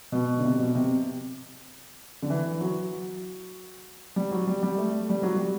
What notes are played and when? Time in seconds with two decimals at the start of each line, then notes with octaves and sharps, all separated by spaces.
0.12 B2
0.39 D3
0.44 C3
0.59 B2
0.75 C3
2.22 D3
2.30 E3
2.61 F#3
4.16 G3
4.31 F#3
4.47 G3
4.63 G3
4.78 A3
5.09 G3
5.23 F#3
5.36 G3